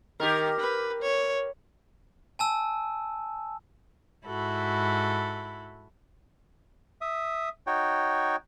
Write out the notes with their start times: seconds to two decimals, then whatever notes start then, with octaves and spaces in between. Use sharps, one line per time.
0.20 D#3 G4 A#4
0.60 B4
1.02 C#5
2.39 G#5 A5 E6
4.26 G#2 E4 F#4 A4 B5
7.01 E5 D#6
7.67 D#4 F#4 C#5 G5